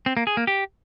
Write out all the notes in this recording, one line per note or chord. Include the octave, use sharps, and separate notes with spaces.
C4
A#3
G#4
A#3
G4